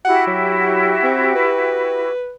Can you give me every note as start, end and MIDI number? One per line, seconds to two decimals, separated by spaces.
0.05 2.10 64
0.05 2.10 66
0.05 2.10 67
0.05 0.22 78
0.27 0.97 54
1.03 1.34 60
1.35 2.34 71